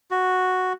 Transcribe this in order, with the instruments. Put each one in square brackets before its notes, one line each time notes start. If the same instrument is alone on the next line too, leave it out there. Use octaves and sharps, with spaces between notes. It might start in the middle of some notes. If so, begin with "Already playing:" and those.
[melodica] F#4